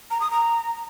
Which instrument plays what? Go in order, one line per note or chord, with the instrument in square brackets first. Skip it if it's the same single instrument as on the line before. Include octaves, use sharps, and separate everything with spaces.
[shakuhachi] A#5
D#6
A#5